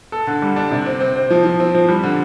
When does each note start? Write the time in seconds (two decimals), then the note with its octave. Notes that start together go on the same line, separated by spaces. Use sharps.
0.12 A4
0.27 D3
0.42 G3
0.56 D4
0.71 C3
0.86 C4
1.00 C4
1.16 C4
1.30 F3
1.45 F3
1.60 C4
1.75 F3
1.88 G3
2.04 D3